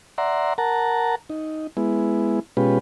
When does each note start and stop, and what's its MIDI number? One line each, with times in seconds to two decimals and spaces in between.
0.18 0.53 74
0.18 0.53 76
0.18 0.53 78
0.18 0.53 82
0.18 0.53 84
0.58 1.15 70
0.58 1.15 78
0.58 1.15 81
0.58 1.15 82
1.30 1.67 63
1.77 2.40 56
1.77 2.40 59
1.77 2.40 64
2.57 2.79 47
2.57 2.79 56
2.57 2.79 61
2.57 2.79 65
2.57 2.79 67
2.57 2.79 71